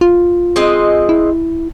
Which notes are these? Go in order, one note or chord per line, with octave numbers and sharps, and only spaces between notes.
F4
G#3 C4 D#5
E4